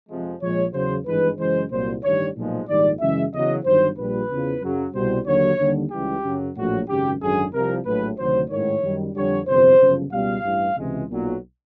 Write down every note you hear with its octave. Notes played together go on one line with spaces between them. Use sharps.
F2 C3 F3 G#3
A#1 A#2 F3 G#3 C#5
E2 C#3 F#3 C5
G#1 G2 E3 G#3 B4
F#2 C#3 E3 G#3 C5
C2 A#2 F#3 C5
A1 G2 D#3 G3 C#5
B1 A#2 F3 G#3
A#1 G#2 D#3 G3 D5
F#2 C#3 E3 G#3 E5
E2 C#3 F#3 D#5
G1 G2 D#3 F#3 C5
A#1 A#2 G3 B4
E2 C#3 F3
F#2 C#3 F#3
C2 B2 G3 C5
D#2 D3 F#3 C#5
D#2 D3 G3
C#2 C#3 E3 G3 G4
F#2 C#3 F#3
A#1 A2 F#3 F#4
G#1 F#2 C#3 F#3 G4
G#1 F#2 D3 G#4
C2 C3 F3 A#4
A#1 A2 F#3 B4
D2 C3 D#3 F#3 C5
A1 G#2 D#3 C#5
F#2 D#3 G3
F2 D3 G3 C#5
G1 F2 C3 E3 C5
G1 F#2 C#3 F3
C#2 B2 G3 F5
A1 G2 E3 G3
C#2 C3 E3 G#3
B1 A#2 F#3